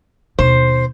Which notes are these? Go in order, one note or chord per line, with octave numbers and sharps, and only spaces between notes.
D#2 B2 C5